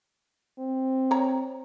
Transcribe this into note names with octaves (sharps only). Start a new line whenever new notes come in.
C4
C#5 A#5